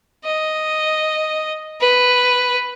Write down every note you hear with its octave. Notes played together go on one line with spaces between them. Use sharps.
D#5
B4